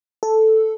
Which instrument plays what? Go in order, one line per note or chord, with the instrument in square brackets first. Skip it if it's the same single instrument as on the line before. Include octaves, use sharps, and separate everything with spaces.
[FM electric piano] A4